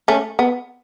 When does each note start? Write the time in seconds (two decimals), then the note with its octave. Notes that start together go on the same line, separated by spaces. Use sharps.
0.08 A3 C#4
0.39 B3